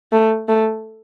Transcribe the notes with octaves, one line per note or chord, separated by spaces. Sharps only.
A3
A3